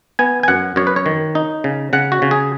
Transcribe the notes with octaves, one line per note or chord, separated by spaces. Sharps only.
B3 G#5
G#5
F#2 F#5
F#2 C#5
B4
C#5
D#3
D#4
C#3
C#3 F#5
F#4
C#3
G#4